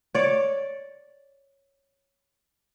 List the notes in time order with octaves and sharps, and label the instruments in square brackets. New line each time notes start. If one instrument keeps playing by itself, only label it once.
[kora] C#5 D5